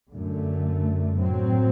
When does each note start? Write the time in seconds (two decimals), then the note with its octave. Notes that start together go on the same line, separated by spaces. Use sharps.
0.12 F#2 D3 A3
1.16 A2 F#3 C4